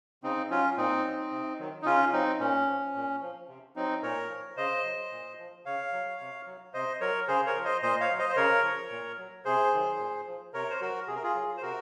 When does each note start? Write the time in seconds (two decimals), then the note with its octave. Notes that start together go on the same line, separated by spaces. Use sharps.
0.23 C#3 C4 D#4
0.50 F#3 C#4 F4
0.77 A#2 C4 D#4
1.05 F#3
1.31 C3
1.59 D#3 F#3
1.82 D#4
1.86 C#3 C#4 F4
2.13 F#3 C4 D#4
2.40 A#2 C#4
2.67 F3
2.95 A#2
3.21 F3
3.49 C3
3.76 F#3 C4 D#4
4.02 A#2 A#4 C#5
4.29 F3
4.57 C#3 C5 D#5
4.85 F#3
5.11 A#2
5.39 F3
5.66 C#3 C#5 F5
5.92 F#3
6.20 C3
6.46 F#3
6.74 C3 C5 D#5
7.01 F#3 A#4 C#5
7.28 C#3 G#4 C5
7.46 A#4 C#5
7.56 F3
7.65 C5 D#5
7.82 A#2 C5 D#5
8.00 C#5 F5
8.10 F#3
8.18 C5 D#5
8.29 C5
8.36 C#3 A#4 C#5
8.64 F3
8.91 A#2
9.18 F#3
9.45 C3 G#4 C5
9.72 D#3 F#3
9.99 A#2
10.27 F3
10.53 C3 A#4 C#5
10.70 C5
10.81 F#3 F#4 A#4
11.07 C3 G#4
11.15 A#4
11.23 F4 G#4
11.35 F#3
11.57 C5
11.62 C3 F#4 A#4